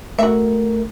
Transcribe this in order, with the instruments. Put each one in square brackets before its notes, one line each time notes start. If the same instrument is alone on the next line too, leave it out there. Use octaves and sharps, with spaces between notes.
[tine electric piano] A3 A#4 [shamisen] F#4 E5